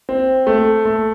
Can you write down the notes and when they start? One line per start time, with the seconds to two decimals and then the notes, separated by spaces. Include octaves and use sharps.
0.09 C4
0.47 A3
0.85 A3